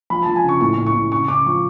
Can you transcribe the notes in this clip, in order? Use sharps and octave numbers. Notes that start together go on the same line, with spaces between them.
F3 B5
F3 A5
G#5
C#3 C#6
A2 C#6
A2
C#6
A2
C#3 C#6
C#3 D6
F3 C#6